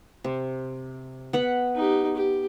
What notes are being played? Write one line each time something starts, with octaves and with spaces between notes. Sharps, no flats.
C3
B3 F#5 B5
D#4 G4
G4